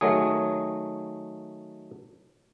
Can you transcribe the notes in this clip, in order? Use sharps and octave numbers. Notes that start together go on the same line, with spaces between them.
D#3 F#3 A3 G#4